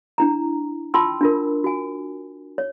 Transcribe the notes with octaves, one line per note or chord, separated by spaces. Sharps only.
D4 E4 A#5
F4 G5 A5 B5 C6 E6
D4 F4 A#4
F#4 G#5
C#5